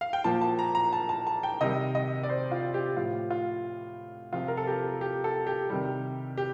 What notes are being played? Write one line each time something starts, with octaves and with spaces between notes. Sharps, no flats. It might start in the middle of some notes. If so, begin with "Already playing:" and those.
F5
G5
A#2 F3 A5
A5
A#5
A#5
A5
A5
A5
G5
C3 D#3 G3 D#5
D#5
D5
C5
F4
G4
A2 F3 F4
F4
C3 F3 F4
A#4
A4
G4
G4
A4
G4
C3 D#3 G3
G4